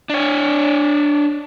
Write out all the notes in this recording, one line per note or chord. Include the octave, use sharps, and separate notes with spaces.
D4 C#5